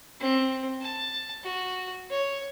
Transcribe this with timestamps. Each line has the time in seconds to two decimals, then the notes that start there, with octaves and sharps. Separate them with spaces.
0.20 C4
0.81 A5
1.43 F#4
2.10 C#5